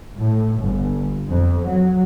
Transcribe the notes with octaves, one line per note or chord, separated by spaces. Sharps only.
A2
G1
F2
F#3